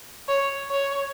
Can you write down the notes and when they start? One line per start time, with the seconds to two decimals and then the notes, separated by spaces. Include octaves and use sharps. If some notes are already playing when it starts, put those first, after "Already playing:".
0.28 C#5
0.70 C#5